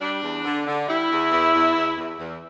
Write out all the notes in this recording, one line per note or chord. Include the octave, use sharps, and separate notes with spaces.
G3 D4
E2
D3
D3
G3 E4
E2
E2
E2
E2
E2
E2